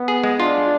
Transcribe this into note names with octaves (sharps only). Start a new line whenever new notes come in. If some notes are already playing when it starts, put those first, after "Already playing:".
Already playing: B3
G#4
G#3
D4 F4